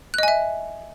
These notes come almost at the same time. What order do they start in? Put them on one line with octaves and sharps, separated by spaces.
F#6 D#5 G#5 E5